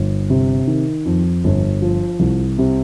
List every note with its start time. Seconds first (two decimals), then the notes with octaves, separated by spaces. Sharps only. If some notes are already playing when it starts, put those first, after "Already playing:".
Already playing: G1
0.30 C3
0.67 D#3
1.05 F2
1.44 G1
1.82 F3
2.19 C2
2.58 C3